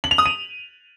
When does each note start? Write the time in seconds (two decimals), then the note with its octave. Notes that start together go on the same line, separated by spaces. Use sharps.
0.04 F#7
0.11 F7
0.18 D#6
0.26 D#7